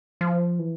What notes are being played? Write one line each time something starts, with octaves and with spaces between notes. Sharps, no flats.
F3
E3